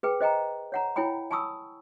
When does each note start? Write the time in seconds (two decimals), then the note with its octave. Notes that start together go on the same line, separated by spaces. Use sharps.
0.03 G#4 B4 G5
0.21 C5 D#5 G5 A#5
0.72 C#5 F#5 A#5
0.96 E4 C#5 G5 G#5 B5
1.31 G#5 A5 B5 C#6 D#6 E6